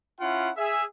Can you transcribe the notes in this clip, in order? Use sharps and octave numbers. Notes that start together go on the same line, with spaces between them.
C#4 E4 F4 F#5
G#4 E5